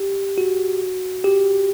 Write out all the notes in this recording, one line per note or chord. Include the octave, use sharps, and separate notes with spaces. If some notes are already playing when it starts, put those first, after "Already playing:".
Already playing: G4
F#4
G4